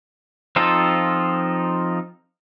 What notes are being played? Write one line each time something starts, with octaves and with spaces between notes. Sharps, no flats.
F3 C4 D#4 F4 A4